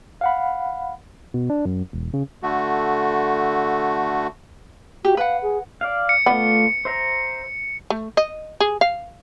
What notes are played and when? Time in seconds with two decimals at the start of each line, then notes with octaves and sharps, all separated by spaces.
0.21 F5 F#5 B5
1.34 B2
1.50 D4
1.65 F#2
1.93 E1
2.14 C#3
2.43 D3 A3 F#4
5.05 F#4 G4
5.17 B4 F5 F#5
5.43 G#4
5.81 D5 F5
6.09 C#7
6.26 A3 B3 F4 D5
6.85 C5 E5 A#5
7.90 A3
8.17 D#5
8.60 G#4
8.81 F5